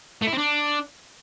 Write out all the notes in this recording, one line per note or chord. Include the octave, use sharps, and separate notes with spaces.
A3
E4
C4
D4